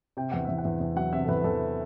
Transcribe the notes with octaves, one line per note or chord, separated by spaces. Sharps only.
C3 G5
E2 F#5
E2 E5
F#5
E2
E2
F#3 F#5
C3 E5
A4
E2 B4
E2 A4